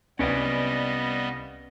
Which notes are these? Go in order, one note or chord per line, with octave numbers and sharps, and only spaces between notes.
C2 G3 B3 C#4 B4 D5 D#5 F5